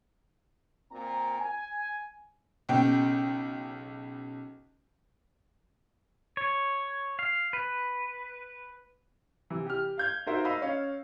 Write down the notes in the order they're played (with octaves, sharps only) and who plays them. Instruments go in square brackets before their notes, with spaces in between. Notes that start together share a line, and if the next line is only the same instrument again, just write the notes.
[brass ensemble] A#2 C4 A#5
G#5
[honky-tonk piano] B1 C#3 G5
[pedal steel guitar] C#5
F5
B4
[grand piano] C3 E3
G4 F6
F5 G6 G#6
D#4 F4 F#4 A#4 C5 E5
D#5 F5 B5 E6
C#4 C#5 F5